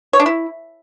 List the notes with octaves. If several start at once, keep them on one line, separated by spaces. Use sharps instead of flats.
C#5
D4
E4